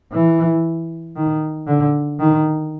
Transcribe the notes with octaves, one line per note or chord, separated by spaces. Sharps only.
E3
D#3
D3
D#3